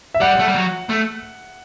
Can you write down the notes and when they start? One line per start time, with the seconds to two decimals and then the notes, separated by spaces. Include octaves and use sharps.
0.14 E5
0.20 G3 F#5
0.39 A3
0.48 G3
0.54 F#3
0.89 A3